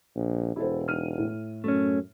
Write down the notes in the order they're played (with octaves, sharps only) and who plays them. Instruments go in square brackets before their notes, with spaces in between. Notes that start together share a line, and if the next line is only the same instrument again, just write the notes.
[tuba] A#1
[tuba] E1 [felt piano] E4 A4 C5
[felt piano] D#4 F6 D#7
A2
[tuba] F#2 [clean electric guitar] A3 C#4